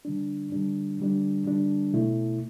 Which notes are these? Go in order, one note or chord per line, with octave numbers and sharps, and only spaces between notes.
D3 G3 D4
D3 G3 D4
D3 G3 D4
D3 G3 D4
B2 A3 E4